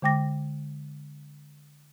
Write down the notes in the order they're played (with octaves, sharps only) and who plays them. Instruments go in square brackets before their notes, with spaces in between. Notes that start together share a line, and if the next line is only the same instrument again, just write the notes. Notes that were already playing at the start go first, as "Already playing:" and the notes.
[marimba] D3 G#3 G5 D6 A#6